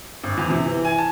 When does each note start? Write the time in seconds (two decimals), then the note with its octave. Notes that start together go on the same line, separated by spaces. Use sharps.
0.24 G#1
0.37 E2
0.50 C3
0.65 E3
0.85 G#5
0.98 A5